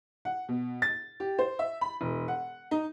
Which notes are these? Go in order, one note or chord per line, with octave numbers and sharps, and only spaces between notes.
F#5
B2
A6
G4
C5
E5
B5
E1
F#5
D#4